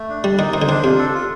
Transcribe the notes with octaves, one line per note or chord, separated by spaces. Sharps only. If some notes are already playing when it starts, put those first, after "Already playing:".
Already playing: A3
D4
G3 D5
D#3 D#4
D#3 C5
D3
D#3 D4
C3 F4
A4
F4